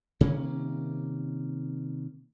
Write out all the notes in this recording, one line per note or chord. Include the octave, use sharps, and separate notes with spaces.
C3 D#3 A#3 C#4